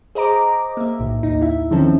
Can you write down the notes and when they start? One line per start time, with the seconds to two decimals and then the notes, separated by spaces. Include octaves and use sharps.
0.15 G#4 C5 D#5 A#5 D6
0.77 A#3 E5
0.99 B1 A2
1.23 D#2 D#4
1.41 E4 E5
1.71 D#3 F3 C4 C#4 A4